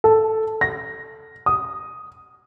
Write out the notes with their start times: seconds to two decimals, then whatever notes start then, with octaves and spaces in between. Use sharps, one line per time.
0.04 A4
0.61 A#6
1.46 D#6